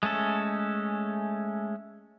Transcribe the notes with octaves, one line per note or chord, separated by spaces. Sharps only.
G#3 A3 C#4 A4